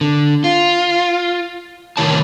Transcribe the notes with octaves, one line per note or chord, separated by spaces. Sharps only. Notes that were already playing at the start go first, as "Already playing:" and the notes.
D3
F4
A2 C3 D#3 E4 C#5 A5